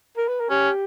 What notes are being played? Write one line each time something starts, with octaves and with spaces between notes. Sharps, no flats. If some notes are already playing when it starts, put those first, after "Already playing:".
A#4
B4
A#4
C#4 G4